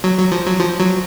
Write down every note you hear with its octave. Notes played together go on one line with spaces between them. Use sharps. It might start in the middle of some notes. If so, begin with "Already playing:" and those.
F#3
F#3
F3
F#3
F3
F#3